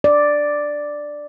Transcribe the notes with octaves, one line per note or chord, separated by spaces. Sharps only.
D5